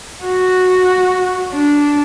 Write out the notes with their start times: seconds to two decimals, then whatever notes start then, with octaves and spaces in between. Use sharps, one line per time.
0.24 F#4
1.54 D4